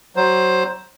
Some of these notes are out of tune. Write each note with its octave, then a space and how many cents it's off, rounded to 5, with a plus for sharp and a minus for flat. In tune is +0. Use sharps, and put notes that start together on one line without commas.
F#3 +20 C5 +10